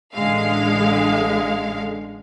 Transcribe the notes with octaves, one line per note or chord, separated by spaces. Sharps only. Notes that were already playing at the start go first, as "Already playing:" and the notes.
A1 D3 G#3 F5